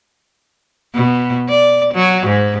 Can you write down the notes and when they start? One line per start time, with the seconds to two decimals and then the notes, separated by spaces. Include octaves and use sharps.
0.95 B2
1.49 D5
1.94 F#3
2.26 G#2